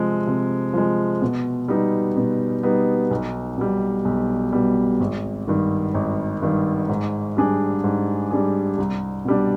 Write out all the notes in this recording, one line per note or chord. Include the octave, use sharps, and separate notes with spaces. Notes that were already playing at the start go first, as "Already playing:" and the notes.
Already playing: C3 F3 G#3
C3
F3 G#3
B2
G3 B3 D#4
B2
G3 B3 D#4
B1
B2 G3
B1
B2 G3
G#1
G2 D#3
G#1
G2 D#3
G#2
G3 D4 G#4
G#2
G3 D4 G#4
C2
B2 G3 D4